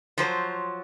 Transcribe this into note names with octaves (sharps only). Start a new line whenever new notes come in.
F3 F#3 C5